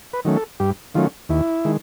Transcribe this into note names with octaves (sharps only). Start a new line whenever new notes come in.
B4
D#3 F#3 A3 C#4
A4
G2 G4
D#3 F#3 A3 C#4 F4
D#2 E4
D#3 G#3